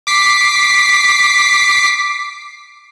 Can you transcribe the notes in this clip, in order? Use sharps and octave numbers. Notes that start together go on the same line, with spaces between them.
D6 B6 C7